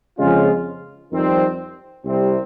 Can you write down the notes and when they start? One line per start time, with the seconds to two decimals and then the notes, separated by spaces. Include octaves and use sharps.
0.18 F2 C#3 G#3 C#4 F4
1.11 F2 D#3 G3 C4
2.05 C2 C3 G3 C4